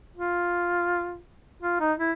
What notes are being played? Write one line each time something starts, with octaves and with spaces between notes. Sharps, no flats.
F4
F4
D#4
E4